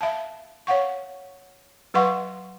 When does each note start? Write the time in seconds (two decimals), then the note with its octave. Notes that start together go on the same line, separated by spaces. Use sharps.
0.01 E5 F5 A5
0.67 C#5 F5 F#5 C#6
1.94 F#3 B4 F5 F#5 C6 C#6